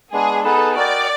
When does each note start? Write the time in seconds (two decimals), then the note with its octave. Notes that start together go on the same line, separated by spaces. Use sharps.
0.13 G#3 B3 D4 G#4
0.44 B3 D#4 G#4 A4 B4
0.76 F#4 A#4 D5 D#5 G5